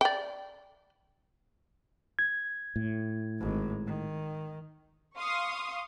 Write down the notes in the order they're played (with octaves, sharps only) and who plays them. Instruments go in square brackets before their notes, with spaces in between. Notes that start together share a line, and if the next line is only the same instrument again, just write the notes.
[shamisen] D5 G5
[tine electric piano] G#6
[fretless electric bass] A2
[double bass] G#1 G#2
D#3
[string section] F5 C6 C#6 D#6